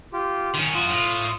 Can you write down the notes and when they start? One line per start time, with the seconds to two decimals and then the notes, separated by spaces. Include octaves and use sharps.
0.13 F4 G4
0.55 D#3 C#4
0.75 F#2 F4 F#4 D#6
0.90 A2